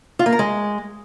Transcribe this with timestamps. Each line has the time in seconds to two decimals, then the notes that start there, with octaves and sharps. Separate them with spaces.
0.19 F4
0.26 A#3
0.32 A#4
0.39 G#3